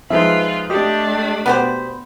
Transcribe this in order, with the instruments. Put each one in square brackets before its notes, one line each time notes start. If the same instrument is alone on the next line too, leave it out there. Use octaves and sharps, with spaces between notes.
[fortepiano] F3 G#3 D#4 [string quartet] F4 B4 [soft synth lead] E5
[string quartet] A3 D4 [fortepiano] G4 [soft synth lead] D#5
[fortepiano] B2 [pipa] B3 G4 C5 [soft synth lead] B5